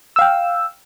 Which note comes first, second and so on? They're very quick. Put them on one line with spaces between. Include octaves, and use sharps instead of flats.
E6 F5 G5